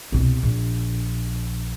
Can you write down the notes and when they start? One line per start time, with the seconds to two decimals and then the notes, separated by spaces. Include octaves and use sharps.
0.12 C2 B2
0.43 A#1